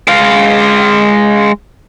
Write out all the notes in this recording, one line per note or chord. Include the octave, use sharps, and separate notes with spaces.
G#3 F5